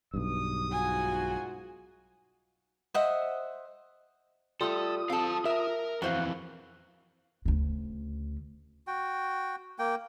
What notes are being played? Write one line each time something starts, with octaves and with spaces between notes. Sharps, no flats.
B1 G2 D#6
G#2 F4 F#4 G#5
C5 D#5 E5 F#5
G3 A3 F4 A4 D#6
C4 A4 F5 A5
A#4 E5
F2 E3 F#4 C5 F5
D2 C#3
F#4 G5
A#3 G5